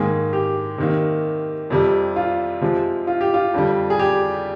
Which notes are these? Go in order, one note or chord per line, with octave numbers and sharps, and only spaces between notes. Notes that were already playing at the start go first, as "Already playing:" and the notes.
Already playing: G#2 D#3 A#3 G#4
G4
C3 D#3 A#3
F2 C3 G3
F4
C3 F3 G#3
F4
G4
F4
F2 D3 G3
G#4
G4